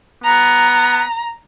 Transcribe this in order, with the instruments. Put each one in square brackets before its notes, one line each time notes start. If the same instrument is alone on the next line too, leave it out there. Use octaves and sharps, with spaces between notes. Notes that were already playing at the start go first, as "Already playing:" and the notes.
[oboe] B3 [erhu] A#5